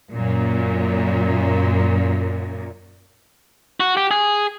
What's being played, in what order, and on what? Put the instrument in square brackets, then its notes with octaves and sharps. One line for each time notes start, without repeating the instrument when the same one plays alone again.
[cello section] F#2 A#2
[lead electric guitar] F#4
G4
G#4